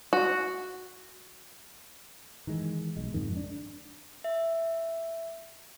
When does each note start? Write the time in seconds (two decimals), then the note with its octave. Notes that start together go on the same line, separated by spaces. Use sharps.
0.13 F#4
2.47 D#3 E3 G#3
2.97 B1 G#3
3.14 F2 G#2 D#3
3.36 D4
4.24 E5